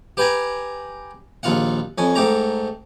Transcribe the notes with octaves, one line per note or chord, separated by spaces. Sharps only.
G4 B4 G5 G#5 A#5
A#1 D#2 F4 F5 F#5
F2 C#4 G#5
G#2 A3 G4 A#5